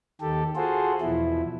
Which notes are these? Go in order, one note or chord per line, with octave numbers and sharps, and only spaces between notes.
D#2 D#3 G4 A4
F4 F#4 G#4 A4 C5
E2 B2 F3 E4